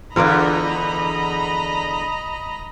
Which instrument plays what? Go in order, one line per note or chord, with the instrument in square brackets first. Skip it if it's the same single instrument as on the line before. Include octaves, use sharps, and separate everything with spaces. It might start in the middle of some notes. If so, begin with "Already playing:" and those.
[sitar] E2 D3 [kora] F4 A#4 D5 [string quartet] D#5 A#5 B5